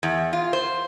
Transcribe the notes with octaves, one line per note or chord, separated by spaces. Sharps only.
E2
F4
C5